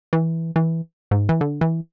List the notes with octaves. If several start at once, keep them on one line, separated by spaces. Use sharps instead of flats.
E3
E3
G#2
E3
D3
E3